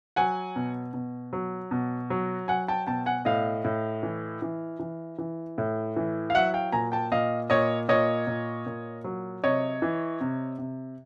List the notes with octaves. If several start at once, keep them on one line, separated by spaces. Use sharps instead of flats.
F#3 F#5 G#5
B2
B2
F#3
B2
F#3
F#3 F#5 G#5
G5 A5
B2 G5 A5
F#5 G#5
A2 D#5 F5
A2
E3
E3
E3
E3
A2
E3
F5
F#3 E5 F#5
F5 G5
A#2 G#5 A#5
G5 A5
A#2 D#5 F5
A#2 C#5 D#5
A#2 C#5 D#5
A#2
A#2
F#3
C3 C#5 D#5
E3
C3
C3